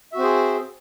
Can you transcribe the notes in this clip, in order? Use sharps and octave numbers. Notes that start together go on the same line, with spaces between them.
C4 F#4 G#4 C5 E5